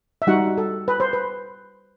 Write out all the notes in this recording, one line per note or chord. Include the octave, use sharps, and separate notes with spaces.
E5
G3 D#4 F#4 F#5
A4
B4
C5
B4